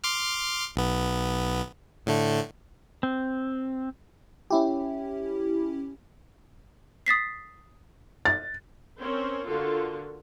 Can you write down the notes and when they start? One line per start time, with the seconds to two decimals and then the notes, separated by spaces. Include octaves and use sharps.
0.04 C6 D6 F6
0.76 B1 B3
2.06 A2 D3 A3
3.03 C4
4.50 C#4 E4 G4
7.06 D#6 A6 B6 C7
8.25 A6
8.99 C4 C#4 A#4 C5
9.45 D3 F4 F#4 A4 A#4